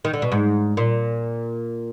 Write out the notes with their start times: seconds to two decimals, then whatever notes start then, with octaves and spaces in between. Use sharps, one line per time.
0.05 D#3
0.13 D3
0.22 B2
0.32 G#2
0.77 A#2